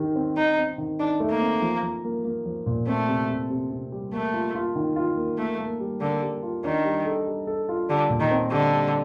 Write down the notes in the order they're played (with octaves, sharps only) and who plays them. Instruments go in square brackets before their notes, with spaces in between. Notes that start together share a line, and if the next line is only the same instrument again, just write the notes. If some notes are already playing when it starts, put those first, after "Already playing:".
Already playing: [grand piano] D#3 G4
C4
[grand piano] C4 [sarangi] D#4
[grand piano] C4
D#3
[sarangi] D4 [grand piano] D#4
[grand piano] A3
[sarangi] A#3
[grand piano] C4
F3
F3
A#3
A#3
F3
A#2
[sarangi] A3 [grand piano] C4
[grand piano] C3
C3
C3
C3
G3
[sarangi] A3 [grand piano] A#3
[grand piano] F4
F4
D#3
F4
A#3
[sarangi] A3 [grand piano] A#3
[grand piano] A#3
G3
[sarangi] D3 [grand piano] A#3
[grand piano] G3
F4
[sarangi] D#3 [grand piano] D4
[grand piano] G3
A4
G3
A4
F4
[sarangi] D3 [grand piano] G3
[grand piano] A#2
[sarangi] D#3
[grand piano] C4
[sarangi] D3 [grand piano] G3
[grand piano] G3